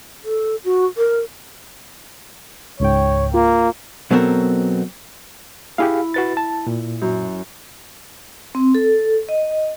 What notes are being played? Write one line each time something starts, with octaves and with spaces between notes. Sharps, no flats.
A4
F#4
A#4
C#2 G#2 C#5 G5
A#3 F4
B2 F#3 B3 C4 A4 A#4
E4 G4 G#4 F5
F#4 B4 A6
A5
A#2
F#2
C4
A4
D#5